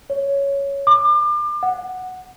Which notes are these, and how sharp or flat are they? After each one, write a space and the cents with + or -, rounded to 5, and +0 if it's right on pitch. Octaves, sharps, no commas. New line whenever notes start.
C#5 +5
D6 +35
F#5 +0